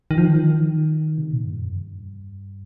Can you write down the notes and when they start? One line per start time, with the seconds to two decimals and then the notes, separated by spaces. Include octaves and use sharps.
0.11 D#3
0.18 F3
0.25 D#3
1.18 C3
1.31 A#2
1.45 G2
1.59 F2
1.72 G2